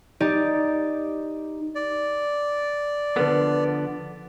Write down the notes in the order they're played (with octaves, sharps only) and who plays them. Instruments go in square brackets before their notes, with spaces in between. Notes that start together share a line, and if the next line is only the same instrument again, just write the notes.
[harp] D#4 G4 D5
[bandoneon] D5
[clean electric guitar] D3 F3 B3 [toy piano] A#4 B4